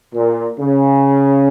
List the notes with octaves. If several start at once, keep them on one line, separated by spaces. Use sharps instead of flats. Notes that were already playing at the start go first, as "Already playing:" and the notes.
A#2
C#3